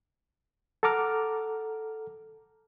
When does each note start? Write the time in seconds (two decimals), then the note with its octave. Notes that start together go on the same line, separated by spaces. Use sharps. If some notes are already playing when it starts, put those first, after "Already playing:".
0.83 A4 F#5 A#5 D6 F6